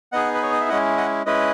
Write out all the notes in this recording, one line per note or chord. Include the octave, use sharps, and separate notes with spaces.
B3 D#4 G#4 D#5 F#5
B4
C#5
D#5
E5
G#3 C#4 E4 D#5 F#5
D#5 F#5
G#3 C#4 E4 B4 D#5